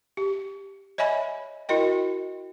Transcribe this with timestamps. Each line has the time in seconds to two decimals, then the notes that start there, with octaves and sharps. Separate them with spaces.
0.17 G4
0.98 C#5 D#5 E5 G#5 B5
1.69 E4 F#4 A#4 D#5 G5